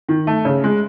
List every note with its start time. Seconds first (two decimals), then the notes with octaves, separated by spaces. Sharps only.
0.09 D#3
0.27 A3
0.45 C#3
0.64 G#3